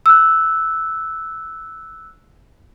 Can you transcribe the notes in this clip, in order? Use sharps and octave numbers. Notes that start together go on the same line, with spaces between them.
E6 F#6